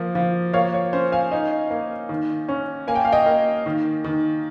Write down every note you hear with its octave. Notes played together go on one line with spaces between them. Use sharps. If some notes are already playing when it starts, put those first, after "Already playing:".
Already playing: F3 A#3
F3
A#3 C#5 F5
C#5
C#4 C5
F5 G#5
D#4
A#3
D#3
C#4
A#3 G#5
G5
F5
D#5 G5
A#3
D#3
D#3